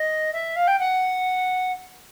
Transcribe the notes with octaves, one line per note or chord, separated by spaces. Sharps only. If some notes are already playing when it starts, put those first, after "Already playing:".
Already playing: D#5
E5
F5
G5
F#5